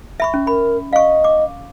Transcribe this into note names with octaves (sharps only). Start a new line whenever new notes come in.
E5 B5 C#6
C#4
A#4 B5
D#5 F5 C#6
D6